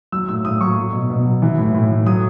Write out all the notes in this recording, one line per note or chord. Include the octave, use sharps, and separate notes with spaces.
F#3 E6
A2 E6
A2 D#6
F#3 C#6
F#3
B2
B2
F#3
E3
A2
A2
E3
F#3 D#6